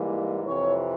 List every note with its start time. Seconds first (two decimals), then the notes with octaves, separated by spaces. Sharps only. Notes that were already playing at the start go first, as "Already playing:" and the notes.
Already playing: G#2 E3 G3 A#3
0.45 F2 C3 E3 C#5